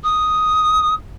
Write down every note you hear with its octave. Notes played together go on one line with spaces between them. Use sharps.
D#6